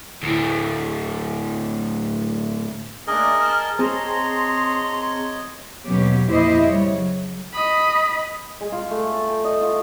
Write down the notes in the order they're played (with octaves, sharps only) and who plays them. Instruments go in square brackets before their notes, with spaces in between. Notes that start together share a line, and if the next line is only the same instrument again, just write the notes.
[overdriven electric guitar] D2 A2
[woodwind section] A3 A#3 D4 [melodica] G#4 A#4 D#5
[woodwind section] A5 F6
[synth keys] C4 G#4 A5 [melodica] C#5 D#5 [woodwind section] A#5 C6
[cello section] D#2 B2 F#3 C#4 G4
F2 A#2 E4 G4 C5 D#5
C#3 G3 C#5
F#3
[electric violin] D#5 B5
[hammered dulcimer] G#3
F4
A3
A5
G5
D#5
F4